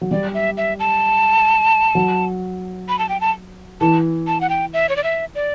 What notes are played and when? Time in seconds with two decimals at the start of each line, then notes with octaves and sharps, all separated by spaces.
0.01 F#3
0.11 G3 D5
0.34 E5
0.57 E5
0.79 A5
1.95 F#3
2.89 B5
2.99 A5
3.09 G5
3.21 A5
3.81 E3 A5
4.27 A5
4.41 F#5
4.49 G5
4.73 E5
4.89 C#5
4.96 D5
5.04 E5
5.35 D5